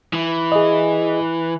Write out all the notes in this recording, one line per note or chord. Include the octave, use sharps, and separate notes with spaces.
E3
G#4 D#5